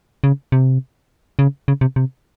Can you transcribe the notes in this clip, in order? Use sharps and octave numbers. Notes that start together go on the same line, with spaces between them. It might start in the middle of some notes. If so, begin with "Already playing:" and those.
C#3
C3
C#3
C#3
C3
C3